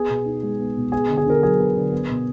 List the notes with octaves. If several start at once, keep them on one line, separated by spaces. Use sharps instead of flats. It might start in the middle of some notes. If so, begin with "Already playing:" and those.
Already playing: B3 G#4
B2
D#4
G#3
B3
B2
B3 G#4
D3
G#4
D3 A#4
F#3 G#4
B3
D3
B3
B2